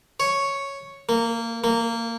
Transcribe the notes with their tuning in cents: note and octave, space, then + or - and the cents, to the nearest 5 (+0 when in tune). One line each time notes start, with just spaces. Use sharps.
C#5 +0
A#3 -20
A#3 -20